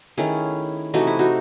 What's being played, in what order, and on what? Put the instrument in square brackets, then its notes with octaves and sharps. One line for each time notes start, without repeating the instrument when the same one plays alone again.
[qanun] D#3 A3 C#4 E4 G#4
C3 E3 A3 D#4 F#4
E4
D#4 F#4